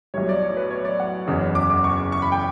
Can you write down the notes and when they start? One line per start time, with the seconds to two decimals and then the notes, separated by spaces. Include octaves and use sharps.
0.14 B1 A2 G3 C#5
0.29 D5
0.43 C#5
0.57 B4
0.70 C#5
0.85 D5
1.00 F#5
1.28 F#1 E2 C#3
1.55 D6
1.70 D6
1.84 C#6
2.12 C#6
2.22 B5
2.32 G5